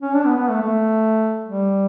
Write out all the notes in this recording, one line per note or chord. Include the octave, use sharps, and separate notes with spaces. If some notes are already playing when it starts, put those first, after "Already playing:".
C#4
D4
B3
B3
A3
A3
G3